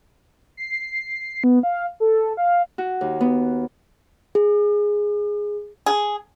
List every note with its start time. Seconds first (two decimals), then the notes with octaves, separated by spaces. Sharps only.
0.57 C7
1.44 B3
1.63 F5
2.00 A4
2.37 F5
2.78 F#4
3.01 D#2
3.21 B3
4.35 G#4
5.86 G#4